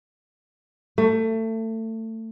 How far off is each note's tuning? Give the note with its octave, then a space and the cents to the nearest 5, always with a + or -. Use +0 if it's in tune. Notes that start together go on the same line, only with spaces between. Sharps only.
A3 +25